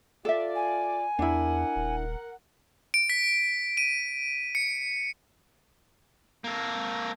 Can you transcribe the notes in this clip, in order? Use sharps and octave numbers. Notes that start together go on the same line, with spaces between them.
F4 A4 D5 E5
G#5
E2 D4 E4 A#4 F#5
D#1
D7
B6
D#7
C#7
A#3 A4